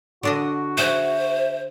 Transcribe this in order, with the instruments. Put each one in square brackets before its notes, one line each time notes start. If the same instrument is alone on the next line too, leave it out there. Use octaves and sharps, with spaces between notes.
[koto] D3 D4 D#5 [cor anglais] F#4
[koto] G#4 F#5 [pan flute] C5 [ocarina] E5